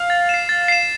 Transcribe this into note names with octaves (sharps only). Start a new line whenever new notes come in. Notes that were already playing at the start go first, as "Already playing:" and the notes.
Already playing: F5
A6
C7 E7
A6
C7 E7